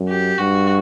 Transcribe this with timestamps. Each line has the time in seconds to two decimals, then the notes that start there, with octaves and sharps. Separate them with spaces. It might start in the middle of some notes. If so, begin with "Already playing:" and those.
Already playing: F#2
0.09 G4
0.38 G2 F#4